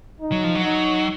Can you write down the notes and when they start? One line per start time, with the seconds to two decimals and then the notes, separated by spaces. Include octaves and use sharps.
0.20 D#4
0.32 F#3
0.44 F3
0.55 F#3
0.64 D#4